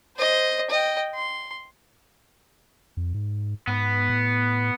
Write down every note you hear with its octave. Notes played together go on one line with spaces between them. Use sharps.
C5 D#5
D#5 G5
C6
F2
G#2
G#2 B3
A2